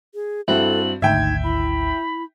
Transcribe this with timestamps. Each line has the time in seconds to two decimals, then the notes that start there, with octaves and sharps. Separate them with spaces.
0.14 G#4
0.48 G2 C4 E4 F#4 A4 F#7
1.02 G#1 D2 D#4 E5 G5 G#6
1.44 E4 B5